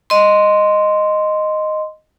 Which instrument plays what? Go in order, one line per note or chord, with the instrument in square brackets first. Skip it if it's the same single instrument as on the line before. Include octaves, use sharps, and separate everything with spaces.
[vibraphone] D#5 C6